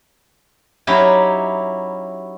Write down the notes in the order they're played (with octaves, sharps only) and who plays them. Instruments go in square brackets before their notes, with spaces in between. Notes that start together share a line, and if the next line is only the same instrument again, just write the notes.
[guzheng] F#3 C#4 D#4 E4 G4